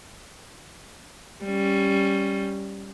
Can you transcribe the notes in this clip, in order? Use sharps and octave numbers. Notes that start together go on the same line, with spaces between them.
G3 C#4